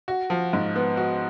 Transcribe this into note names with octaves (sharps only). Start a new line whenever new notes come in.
F#4
F3
G#2
B3
F#4